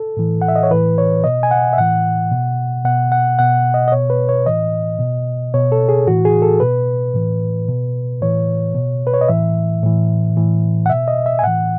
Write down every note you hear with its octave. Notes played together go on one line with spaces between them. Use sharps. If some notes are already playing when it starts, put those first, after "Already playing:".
Already playing: A4
A2 E3
F#5
E5
D#5
C#5
A2 E3 B4
C#5
B2 D#5
G#5
F#5
E5
A2 E3 F#5
B2
B2 F#5
F#5
B2 F#5
D#5
D#5
B2 C#5
B4
C#5
A2 E3 D#5
B2
B2 C#5
A4
G#4
A2 E3 F#4
G#4
A4
B2 B4
A2 E3
B2
A2 E3 C#5
B2
B4
C#5
D#5
A2 E3 E5
A2 E3
A2 E3
F#5
B2 E5
D#5
E5
G#5
A2 E3 F#5